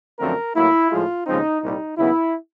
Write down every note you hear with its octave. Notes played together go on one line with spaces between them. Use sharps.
F#2 D3 F3 A3 C4 A#4
A2 F#3 A#3 E4
A2 F3 G#3 F4
D#2 C#3 F3 G#3 C4 D#4
C2 A#2 G3 D#4
D#2 C#3 F#3 B3 E4